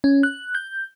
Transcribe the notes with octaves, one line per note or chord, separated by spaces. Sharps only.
C#4
F#6
G6